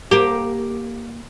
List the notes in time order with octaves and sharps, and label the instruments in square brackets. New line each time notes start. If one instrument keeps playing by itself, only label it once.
[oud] A#3 G4